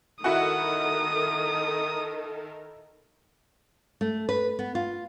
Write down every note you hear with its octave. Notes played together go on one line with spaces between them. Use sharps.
D#3 E4 F#4 A4 A#4 F#5 D#6
A3
B4
B3
F4